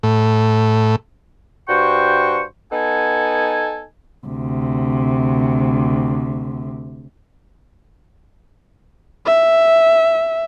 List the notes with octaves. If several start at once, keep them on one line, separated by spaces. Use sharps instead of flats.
A2
G2 F#4 C5 G5 C#6
B3 D#4 A4 F#5 G#5
D2 C3
E5